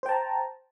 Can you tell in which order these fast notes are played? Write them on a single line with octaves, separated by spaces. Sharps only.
C5 G5 A5 A#5